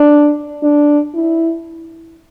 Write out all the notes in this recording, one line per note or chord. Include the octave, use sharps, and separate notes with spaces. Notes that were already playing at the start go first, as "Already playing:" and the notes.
Already playing: D4
D4
E4